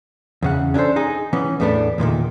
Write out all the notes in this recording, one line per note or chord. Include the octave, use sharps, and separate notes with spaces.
E2 C#3 F#5
C#4 D4 G4 A4 C5
D#4 G#4
E3 B3 C#4
E2 A2 A3 B3 D4
E2 A#2 D3 D#3